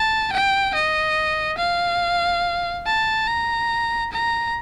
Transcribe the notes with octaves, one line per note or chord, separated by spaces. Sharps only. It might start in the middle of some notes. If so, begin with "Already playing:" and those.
Already playing: A5
G5
D#5
F5
A5
A#5
A#5